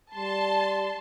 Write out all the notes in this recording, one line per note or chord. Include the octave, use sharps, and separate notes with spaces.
G3 A5 C6